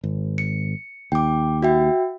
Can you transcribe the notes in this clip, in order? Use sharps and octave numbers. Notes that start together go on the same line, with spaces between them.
G#1
C#7
D#2 G5 D6
F#4 E5 G5